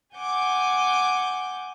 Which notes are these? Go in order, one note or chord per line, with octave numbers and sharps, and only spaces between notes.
F#5 G#5 D6 G6